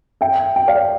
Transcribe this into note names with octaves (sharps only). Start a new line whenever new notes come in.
E5 G5
G5
D5 F5